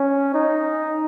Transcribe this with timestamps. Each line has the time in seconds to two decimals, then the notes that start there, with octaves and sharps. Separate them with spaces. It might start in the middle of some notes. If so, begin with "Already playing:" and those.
Already playing: C#4
0.34 D#4